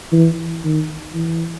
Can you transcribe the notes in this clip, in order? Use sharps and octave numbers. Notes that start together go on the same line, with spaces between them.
E3
D#3
E3